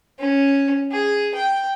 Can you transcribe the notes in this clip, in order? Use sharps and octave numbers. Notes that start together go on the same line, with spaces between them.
C#4
G#4
G5